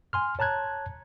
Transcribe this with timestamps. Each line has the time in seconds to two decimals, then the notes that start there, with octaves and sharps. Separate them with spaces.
0.13 G#5 C6 F6
0.39 C#5 A5 A#5 F#6 G#6